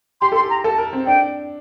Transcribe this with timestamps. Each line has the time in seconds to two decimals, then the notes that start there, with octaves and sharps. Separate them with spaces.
0.21 G4 C6
0.32 A4 C6
0.43 G4
0.50 A#5
0.64 A4 A5
0.78 A#4
0.93 C4
1.06 D4 G5